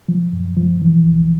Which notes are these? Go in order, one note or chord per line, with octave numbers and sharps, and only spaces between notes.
F3
F#2
F3
E3
C#2